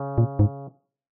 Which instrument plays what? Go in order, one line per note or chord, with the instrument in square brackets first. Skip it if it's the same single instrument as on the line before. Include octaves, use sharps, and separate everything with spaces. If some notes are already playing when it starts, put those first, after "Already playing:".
Already playing: [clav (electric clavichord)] C#3
[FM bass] A#2
G#2